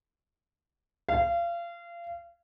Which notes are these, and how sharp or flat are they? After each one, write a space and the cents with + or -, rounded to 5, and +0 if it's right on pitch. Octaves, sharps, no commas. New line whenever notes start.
F5 -30